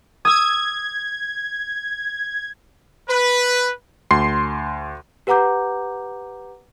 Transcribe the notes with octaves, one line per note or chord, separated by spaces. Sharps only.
D#6 E6 G#6
B4
D2 C6 C7
G4 B4 F#5 A#5 D6 G6